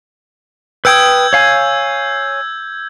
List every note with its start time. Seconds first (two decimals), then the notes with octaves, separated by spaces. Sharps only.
0.85 B4 G5 D#6 E6 G6 G#6
1.33 C#5 F5 G#5